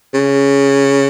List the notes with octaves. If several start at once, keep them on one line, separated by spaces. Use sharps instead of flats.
C#3